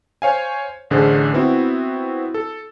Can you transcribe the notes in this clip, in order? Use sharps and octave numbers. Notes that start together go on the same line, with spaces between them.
C5 C#5 F5 G#5
A1 D3 G#4 A4 C5
B3 C4 E4 F#4
A4